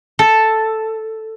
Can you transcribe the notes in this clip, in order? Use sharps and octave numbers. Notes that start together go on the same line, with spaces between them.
A4